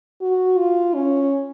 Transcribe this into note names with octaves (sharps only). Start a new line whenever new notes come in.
F#4
F4
C#4